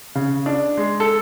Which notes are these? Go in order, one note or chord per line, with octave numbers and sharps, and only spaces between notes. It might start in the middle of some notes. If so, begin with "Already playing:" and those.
C#3
D4
G#3
A4